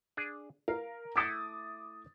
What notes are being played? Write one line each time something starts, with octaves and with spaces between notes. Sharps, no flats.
D4 G#4
A#4 F5
A3 E4 A4 D6 D#6 A6